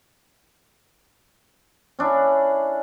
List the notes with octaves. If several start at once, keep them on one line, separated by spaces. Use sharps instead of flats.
C#4 D4 E4